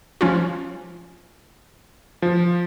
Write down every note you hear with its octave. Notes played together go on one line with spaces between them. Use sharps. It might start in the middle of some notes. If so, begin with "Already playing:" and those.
F3 C#4 F4
F3